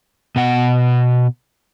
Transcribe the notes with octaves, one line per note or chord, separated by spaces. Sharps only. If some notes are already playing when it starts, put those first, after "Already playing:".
B2 F#5